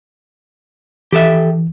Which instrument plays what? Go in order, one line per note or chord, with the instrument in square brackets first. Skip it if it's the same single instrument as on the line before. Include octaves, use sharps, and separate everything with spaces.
[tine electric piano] E3 [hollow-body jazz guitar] G4 A4 E5